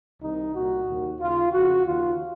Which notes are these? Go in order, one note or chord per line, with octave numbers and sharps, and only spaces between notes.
C2 C3 D#3 D#4
C2 A#2 F#4
D#2 D#3
D#2 C#3 F4
F2 C#3 F#4
D#2 D#3 F4